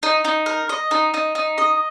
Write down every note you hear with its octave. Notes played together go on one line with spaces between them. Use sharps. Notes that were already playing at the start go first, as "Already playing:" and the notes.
D#4
D#4
A#4
D#5
D#4
D#4
D#4
D#5